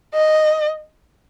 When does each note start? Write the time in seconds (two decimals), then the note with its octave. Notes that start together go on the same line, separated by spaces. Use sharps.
0.14 D#5